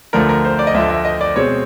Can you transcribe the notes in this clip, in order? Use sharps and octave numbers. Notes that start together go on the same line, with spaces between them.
D2 D3 F3 A3 A#4
A#4
C5
D5
D#5
D2 D3 F3 A3 E5
E5
D#5
D5
B2 G#3 C4 C#5